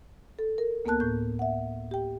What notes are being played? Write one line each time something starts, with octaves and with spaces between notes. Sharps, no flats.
A4
A#4
D2 A#3 B3 A#4 A5 F#6
A2 G6
E5 F#5
G4 G5